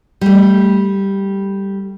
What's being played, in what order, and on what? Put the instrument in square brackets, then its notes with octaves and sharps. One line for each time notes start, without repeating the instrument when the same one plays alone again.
[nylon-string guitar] G3 A3